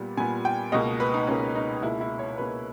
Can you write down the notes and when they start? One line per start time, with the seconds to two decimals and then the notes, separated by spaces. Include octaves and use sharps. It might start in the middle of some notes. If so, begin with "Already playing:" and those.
Already playing: A#2 G3 B3
0.17 A#2 G3 B3 G#5
0.45 G5
0.72 C#2 B2 A#3 D#5
1.00 B4
1.14 D#4
1.27 C#2 B2 A#3 C#4
1.55 D#4
1.82 C#2 B2 A#3 E4
2.01 E4
2.19 C#5
2.38 C#2 B2 A#3 B4